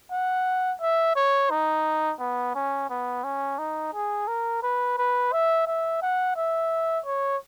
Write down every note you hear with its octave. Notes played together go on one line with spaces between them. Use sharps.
F#5
E5
C#5
D#4
B3
C#4
B3
C#4
D#4
G#4
A#4
B4
B4
E5
E5
F#5
E5
C#5